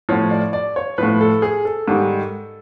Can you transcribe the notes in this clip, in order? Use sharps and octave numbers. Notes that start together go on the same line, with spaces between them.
A2 F3 C#5
D5
D5
C#5
A2 F3 B4
A4
G#4
A4
G#2 D#3 G3